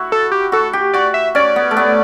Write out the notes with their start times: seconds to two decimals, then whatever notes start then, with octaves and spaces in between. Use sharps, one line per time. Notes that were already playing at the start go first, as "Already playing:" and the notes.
Already playing: E4 F#4
0.12 A4
0.32 G4
0.52 F#4 A4
0.73 G4
0.93 F#4 D5
1.14 E5
1.35 C#4 D5
1.56 B3
1.71 A3
1.77 B3